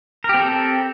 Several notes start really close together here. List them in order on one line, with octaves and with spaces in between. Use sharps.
A#4 G4 C4 A4